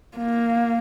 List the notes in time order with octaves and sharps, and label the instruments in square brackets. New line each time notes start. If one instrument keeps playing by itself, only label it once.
[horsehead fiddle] A#3